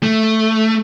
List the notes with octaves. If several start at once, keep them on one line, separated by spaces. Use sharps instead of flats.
A3